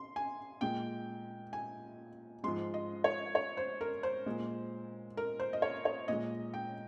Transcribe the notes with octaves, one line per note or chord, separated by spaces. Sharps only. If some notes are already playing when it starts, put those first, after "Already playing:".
Already playing: C6
G#5
A#2 G#3 G5
G#5
G#2 F3 G#3 C6
D#5
C#5
C#5
C5
A#4
C5
A#2 G#3
A#4
C5
D#5
C#5
C#5
A#2 G#3 D#5
G5